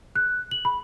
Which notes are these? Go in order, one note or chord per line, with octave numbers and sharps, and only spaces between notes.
F#6
F#7
B5